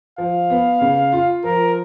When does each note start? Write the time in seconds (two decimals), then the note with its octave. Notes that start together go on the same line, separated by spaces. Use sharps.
0.18 F3 F5
0.50 B3
0.81 C#3
1.12 F4
1.44 F3 A#4